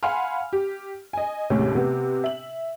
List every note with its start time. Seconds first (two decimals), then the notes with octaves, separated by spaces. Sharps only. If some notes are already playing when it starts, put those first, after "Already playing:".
0.03 F5 F#5 G#5 B5 C6 F6
0.53 G4
1.13 D#5 G#5
1.50 D#2 A2 C3 G#3 C#4
1.75 C3 B3
2.24 E5 F#7